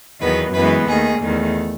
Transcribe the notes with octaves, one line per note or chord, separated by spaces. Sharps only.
E2 D#3 F#3 B3 B4
F#2 E3 G#3 B3 B4
D#2 D#3 A3 G#4
E2 D#3 A3